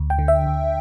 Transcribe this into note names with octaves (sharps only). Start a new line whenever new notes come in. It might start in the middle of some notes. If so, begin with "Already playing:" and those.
Already playing: D2
G5
D3
E5
D2